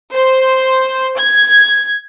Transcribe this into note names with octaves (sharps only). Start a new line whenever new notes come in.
C5
G#6